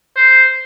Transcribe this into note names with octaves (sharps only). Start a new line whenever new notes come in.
C5